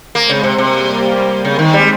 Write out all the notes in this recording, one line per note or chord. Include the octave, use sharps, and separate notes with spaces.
G#3 A#3 C4
C#3
C3
C3 G3 A#3
C#3 G#3 C4
D#3
G3